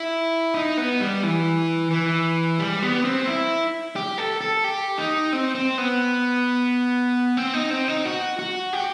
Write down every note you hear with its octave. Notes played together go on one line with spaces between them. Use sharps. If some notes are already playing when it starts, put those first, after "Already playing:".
Already playing: E4
D#4
B3
G3
E3
E3
G3
B3
C4
E4
G4
A4
A4
G4
D#4
C4
C4
B3
C4
D#4
C4
D#4
F#4
F#4
G4